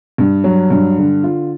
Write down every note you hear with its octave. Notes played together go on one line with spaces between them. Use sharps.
G2
F#3
G2
D3
F4